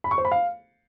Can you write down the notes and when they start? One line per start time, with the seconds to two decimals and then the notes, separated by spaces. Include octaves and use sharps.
0.04 B5
0.11 C#6
0.18 C5
0.25 B5
0.31 F5